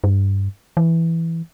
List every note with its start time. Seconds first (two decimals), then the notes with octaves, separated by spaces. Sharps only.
0.04 G2
0.77 E3